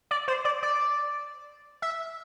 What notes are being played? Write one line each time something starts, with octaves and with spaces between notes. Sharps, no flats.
D5
C5
D5
D5
E5